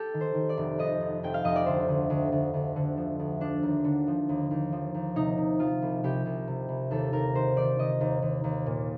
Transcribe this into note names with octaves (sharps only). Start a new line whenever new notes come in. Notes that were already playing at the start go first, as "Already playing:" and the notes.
Already playing: G4 A4
D#3
C5
D#3
D5
F1
F2 D#5
F1
F1 G5
F5
F1 D#5
D5
D2 C5
D2
D2
D2
D2
D3
F3
D2
F3 D4
D#2
D3
F3
D#2
D#2
F3
D#2
C3 D#4
C3
F3 F4
C2
C2 G4
C2
C3
C2
D#2 A4
D#2 A#4
D#3 C5
D#3 D5
D#3 D#5
D#2
D#2
D#2
A#2